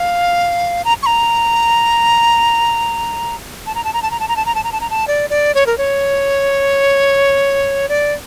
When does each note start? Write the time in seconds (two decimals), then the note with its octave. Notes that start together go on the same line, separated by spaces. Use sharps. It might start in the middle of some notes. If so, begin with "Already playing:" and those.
Already playing: F5
0.85 A#5
1.03 C#6
1.06 A#5
3.66 A5
3.75 A#5
3.84 A5
3.93 A#5
4.02 A5
4.11 A#5
4.20 A5
4.28 A#5
4.36 A5
4.46 A#5
4.55 A5
4.64 A#5
4.72 A5
4.81 A#5
4.90 A5
5.08 D5
5.30 D5
5.55 C#5
5.66 A#4
5.78 C#5
7.89 D5